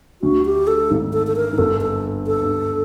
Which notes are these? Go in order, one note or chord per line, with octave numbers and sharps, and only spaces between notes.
D2 D3 F#4
G4
A4
G#1 G#2
A4
A4
A#4
G#2
G1 G2 A4
A4
A4
G1 G2